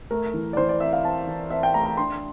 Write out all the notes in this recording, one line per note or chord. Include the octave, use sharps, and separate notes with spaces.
A3 A#4
E3
D5
E3 C5
D5
C4 E5
F5
C4 A5
E3
C4 E5
G5
A3 A#5
A#5
D4 C6